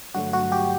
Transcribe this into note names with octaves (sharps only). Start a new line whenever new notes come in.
G2 D3 F#3 A3 F#4
F#4
G4